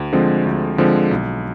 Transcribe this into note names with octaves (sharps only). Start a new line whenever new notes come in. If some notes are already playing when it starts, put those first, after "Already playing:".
Already playing: D2
D3 F3 G#3 C4
D2
D3 F3 G#3 C4
B1